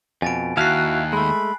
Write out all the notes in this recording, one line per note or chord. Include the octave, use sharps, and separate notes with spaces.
F2 B2 G#5 A6 D7
D#2 E4 F#4 F5 A5 F#6 C7
G#3 A3 B5